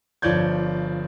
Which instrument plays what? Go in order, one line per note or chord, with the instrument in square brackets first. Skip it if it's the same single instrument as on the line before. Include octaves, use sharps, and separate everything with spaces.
[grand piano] G1 F3 C#5 D5 G6 G#6